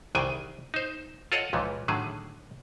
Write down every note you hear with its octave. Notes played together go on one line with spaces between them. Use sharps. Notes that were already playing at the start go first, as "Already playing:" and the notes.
C2 D#3 E3 G#4 G5 G#5
D#4 C5
F4 A4 A#4 C#5 D#5 F#5
C#2 A#2 E3 F3
A2 D3 D#3 F#3 G#4